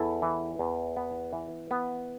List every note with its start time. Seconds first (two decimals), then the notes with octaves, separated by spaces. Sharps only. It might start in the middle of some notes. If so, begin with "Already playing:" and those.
Already playing: E2 E4 A4
0.22 E3
0.59 E2
0.97 B3
1.33 E3
1.71 B3